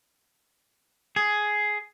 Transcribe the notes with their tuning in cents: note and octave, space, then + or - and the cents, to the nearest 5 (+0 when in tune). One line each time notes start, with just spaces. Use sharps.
G#4 +10